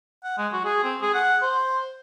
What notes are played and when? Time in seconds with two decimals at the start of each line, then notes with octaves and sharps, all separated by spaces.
0.24 F#5
0.38 G#3
0.52 F#4
0.65 G#4
0.83 C4
1.02 G#4
1.14 F#5
1.42 C5